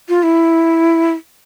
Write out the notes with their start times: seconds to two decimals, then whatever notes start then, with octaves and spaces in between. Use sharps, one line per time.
0.09 F4
0.23 E4